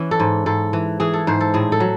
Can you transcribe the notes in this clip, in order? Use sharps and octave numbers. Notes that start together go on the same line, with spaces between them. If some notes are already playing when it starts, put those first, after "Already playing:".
Already playing: E3 C#4 E4
A4
G#2
G#2 A4
E3
E3 G#4
A4
G#2 C5
A4
A2 G#4
A4
F#3